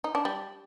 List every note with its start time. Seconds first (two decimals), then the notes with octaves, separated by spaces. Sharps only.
0.04 D#4
0.15 D4
0.25 G3